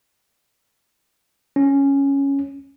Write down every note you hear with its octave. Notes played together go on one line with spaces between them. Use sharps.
C#4